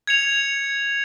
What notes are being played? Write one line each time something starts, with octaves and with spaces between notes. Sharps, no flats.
G#6 C#7 F7